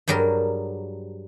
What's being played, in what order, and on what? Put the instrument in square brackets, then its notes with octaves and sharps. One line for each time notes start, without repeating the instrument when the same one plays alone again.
[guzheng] G2 F#3 G3 G#4 A#4